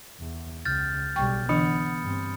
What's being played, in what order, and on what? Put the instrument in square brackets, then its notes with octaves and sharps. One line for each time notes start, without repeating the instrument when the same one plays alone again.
[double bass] E2
[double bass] C#2 [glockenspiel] F6 G6 A6
[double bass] B1 G3 [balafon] G5 C#6
[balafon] D3 E3 D4 [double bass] B3 [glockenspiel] B5 D#6 C#7
[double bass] G2 C4